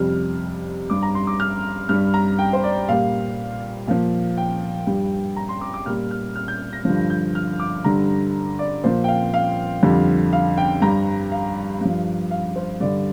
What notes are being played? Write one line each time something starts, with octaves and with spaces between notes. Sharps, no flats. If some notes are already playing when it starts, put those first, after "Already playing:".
Already playing: F2 C3 G3 F6
G2 G3 D6
A#5
C6
D6
F6
G2 G3 F6
A#5
G5
C5
D5
A#2 G3 F5
A#2 F3 F5
G5
G2 G3
A#5
C6
D6
D6
A#2 G3 F6
F6
F6
G6
A#6
G2 D3 F3
G6
F6
D6
G2 D3 G3 A#5
D5
A#2 F3 C5
G5
F5
F5
F2 D3 G3
F5
G5
G2 G3 A#5
F5
G2 F3
F5
C5
G2 D3 G3 D5